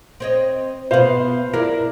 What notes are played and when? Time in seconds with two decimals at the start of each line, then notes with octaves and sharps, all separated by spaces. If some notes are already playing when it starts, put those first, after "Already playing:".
0.20 C4 C#5 D#5
0.91 B2 B3 C5 F5
1.54 D4 E4 A#4